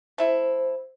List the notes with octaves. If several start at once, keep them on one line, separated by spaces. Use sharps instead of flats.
A3 E4 C5